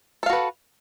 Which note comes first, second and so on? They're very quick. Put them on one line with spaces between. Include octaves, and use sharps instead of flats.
A4 F5 F#4 B4